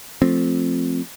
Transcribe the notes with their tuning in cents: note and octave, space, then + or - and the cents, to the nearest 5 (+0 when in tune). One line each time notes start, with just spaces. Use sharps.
F3 +0 A3 +0 C4 +0